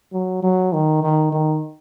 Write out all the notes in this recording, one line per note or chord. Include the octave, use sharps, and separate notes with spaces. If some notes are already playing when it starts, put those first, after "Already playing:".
F#3
F#3
D#3
D#3
D#3